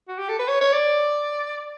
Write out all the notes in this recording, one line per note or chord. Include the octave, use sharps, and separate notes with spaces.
F#4
G4
A4
B4
C#5
C#5
D5